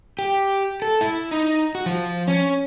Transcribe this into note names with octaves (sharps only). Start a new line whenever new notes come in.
G4
A4
E4
D#4
F#4
F3
C#4